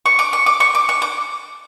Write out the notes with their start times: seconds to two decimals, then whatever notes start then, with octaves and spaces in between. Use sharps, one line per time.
0.06 C#6
0.19 D6
0.33 C#6
0.46 D6
0.60 C#6
0.75 D6
0.89 C#6
1.02 D6